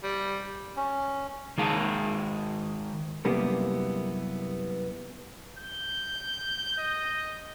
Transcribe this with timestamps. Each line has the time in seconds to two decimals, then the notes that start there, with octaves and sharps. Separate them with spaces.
0.03 G3
0.76 C#4
1.58 D#3 G#3 D#4 G#4 F5 A5
3.25 F#2 C3 G3 A#3 B3 E4
5.59 G6
6.78 D#5